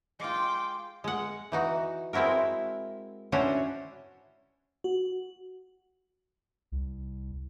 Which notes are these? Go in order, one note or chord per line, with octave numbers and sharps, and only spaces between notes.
G#3 F4 G5 D6
G#3 F#5
E3 D#4 F#4
G#3 C4 E4 F#4 A#4
C#4 D4 E4 F#4 C5 C#5
F#4
C2